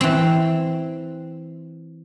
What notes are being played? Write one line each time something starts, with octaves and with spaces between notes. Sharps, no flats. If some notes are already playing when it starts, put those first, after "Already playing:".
E3 C4